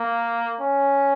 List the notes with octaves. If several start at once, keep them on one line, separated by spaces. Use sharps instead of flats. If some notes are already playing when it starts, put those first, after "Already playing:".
Already playing: A#3
C#4